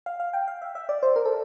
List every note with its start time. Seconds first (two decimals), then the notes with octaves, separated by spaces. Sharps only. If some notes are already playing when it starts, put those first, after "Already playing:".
0.06 F5
0.20 F5
0.33 G5
0.48 F5
0.62 E5
0.75 E5
0.89 D5
1.03 C5
1.16 A#4
1.26 A4